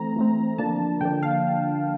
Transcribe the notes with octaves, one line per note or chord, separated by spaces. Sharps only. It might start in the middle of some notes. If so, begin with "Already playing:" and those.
Already playing: E3 A3 C4 A#5
E3 A3 C4
D3 F3 A#3 D4 A5
D3 F3 A#3 D4 G5
F5